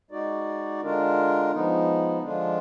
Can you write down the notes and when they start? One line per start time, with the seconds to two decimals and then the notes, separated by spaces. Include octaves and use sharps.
0.11 G#3 D#4 F#4 D5
0.82 D3 G#3 D4 F4 A#4
1.51 F3 G#3 B3 D#4
2.22 D3 F3 G#3 D4 F4